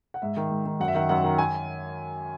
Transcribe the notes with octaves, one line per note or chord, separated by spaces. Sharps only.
F#5
G#2 E5
D#3
G#2
D#3
F#2 F#5
E5
D#3 F#5
F#2 F#5
D#3
G#5